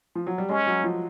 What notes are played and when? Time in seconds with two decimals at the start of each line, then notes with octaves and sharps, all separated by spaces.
0.15 F3
0.27 F#3
0.38 G3
0.49 G#3 C#4
0.67 F#3
0.84 F3